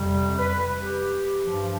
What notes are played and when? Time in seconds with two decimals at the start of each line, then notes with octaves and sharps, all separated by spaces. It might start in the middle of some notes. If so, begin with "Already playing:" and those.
Already playing: F2 C3 G3
0.37 B4
0.81 G4
1.47 G2 F3